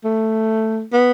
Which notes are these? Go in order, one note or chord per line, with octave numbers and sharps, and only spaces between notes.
A3
B3